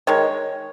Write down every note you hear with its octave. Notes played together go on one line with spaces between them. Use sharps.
D#3 G#3 C#5